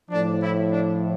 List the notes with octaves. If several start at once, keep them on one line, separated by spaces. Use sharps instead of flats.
A2 F3 D4
E4
D4